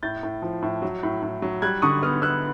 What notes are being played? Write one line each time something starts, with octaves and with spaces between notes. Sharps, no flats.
A2 G6 A6
A2
F3
A2
F#3
A2
A2
F#3
G3 F#6 G#6
D3 C#6 D#6
B3 D#6 F6
B3 E6 F#6